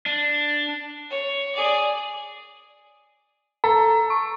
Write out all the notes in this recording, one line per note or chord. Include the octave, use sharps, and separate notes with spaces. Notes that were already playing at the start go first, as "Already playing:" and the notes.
D4
C#5
G#4 D5
A4 A#5
C#6